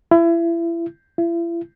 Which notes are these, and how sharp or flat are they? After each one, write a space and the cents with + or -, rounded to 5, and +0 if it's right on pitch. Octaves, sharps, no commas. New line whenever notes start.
E4 +30
E4 +40